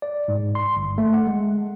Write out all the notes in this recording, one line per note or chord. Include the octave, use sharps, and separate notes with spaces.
D5
G#2
C6
G1
A3
F#5
G#3